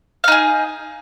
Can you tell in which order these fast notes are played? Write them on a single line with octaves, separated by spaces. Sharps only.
F5 D#4 G#4